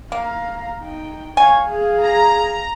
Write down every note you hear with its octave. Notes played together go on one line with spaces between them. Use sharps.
A#3 F5 A#5
D#4 G5
C#5 F5 G#5
G#4 F5
A#5